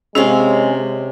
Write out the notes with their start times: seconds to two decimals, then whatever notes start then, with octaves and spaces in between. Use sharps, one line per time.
0.15 C3 G#3 C#4 G#4 F5 C#6